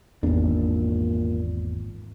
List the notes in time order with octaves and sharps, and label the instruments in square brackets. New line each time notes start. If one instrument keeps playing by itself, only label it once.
[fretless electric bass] G#1 D4 [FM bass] E2 [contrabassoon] A#2